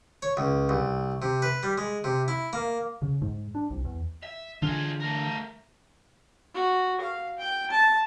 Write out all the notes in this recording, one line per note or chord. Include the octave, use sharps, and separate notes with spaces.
C#5
C#2
C2
C3
B4
G3
G#3
C3
E4
A#3
C#3
G#2
D4
C2
E2
E5
D3 E3 D4 F4 G#4
A3 A#4
F#4
F5
G5
A5